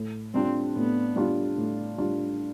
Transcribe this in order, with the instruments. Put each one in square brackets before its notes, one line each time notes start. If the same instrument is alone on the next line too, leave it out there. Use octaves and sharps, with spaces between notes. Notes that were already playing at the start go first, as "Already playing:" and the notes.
Already playing: [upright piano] A2
[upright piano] G3 D4 F4 [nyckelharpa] C4
[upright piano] A2 [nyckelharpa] B3
[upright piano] G3 D4 F4
A2
G3 D4 F4